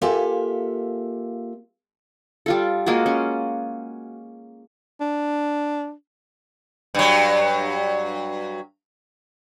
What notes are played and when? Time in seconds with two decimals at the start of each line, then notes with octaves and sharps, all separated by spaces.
0.02 A#3 F4 G4 A4 E5 G#5
2.46 G3 F4 A4
2.86 G#3 A#3 F4 F#4
3.06 C#4
5.01 D4
6.95 G2 F#3